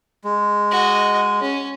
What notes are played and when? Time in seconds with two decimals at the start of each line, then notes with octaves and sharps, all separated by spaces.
0.24 G#3
0.72 F#4 D#5
1.41 C#4